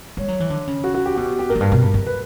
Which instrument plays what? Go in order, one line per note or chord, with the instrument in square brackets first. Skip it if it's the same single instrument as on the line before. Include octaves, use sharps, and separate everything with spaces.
[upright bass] G3 [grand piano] C#5
[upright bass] F#3
E3
D3
C#3
[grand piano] F#4
F#4
G4
[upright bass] B2 [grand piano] G4
[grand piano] G4
[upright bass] A#2 [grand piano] A#4
[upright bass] F#2
G2
B2
G2
F#2
[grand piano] B4